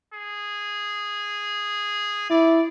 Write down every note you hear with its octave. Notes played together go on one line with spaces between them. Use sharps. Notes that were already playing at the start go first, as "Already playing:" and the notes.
G#4
E4 D5